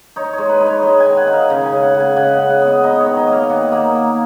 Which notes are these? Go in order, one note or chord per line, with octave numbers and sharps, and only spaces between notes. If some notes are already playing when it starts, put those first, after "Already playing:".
D#4 C#5
G#3 C#5
B4
D#4
C#5
G#3 D#5
G#5
D#3
F#5
D#4
F5
C#3
G#5
C#3
F#5
C#3
G#5
C#3 F#5
F#5
C#3
F#5
B3
D#5
D#4 D#5
C#5
D#3
D#5
A#3
F5
D#3 F#5
A#3
A#3